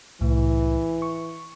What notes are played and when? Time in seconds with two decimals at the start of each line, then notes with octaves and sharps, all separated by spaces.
0.21 C2 A2 E3
1.02 C#6